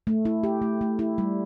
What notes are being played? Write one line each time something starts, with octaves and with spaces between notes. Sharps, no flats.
A3
E4
G4
A3
A3
E4
G3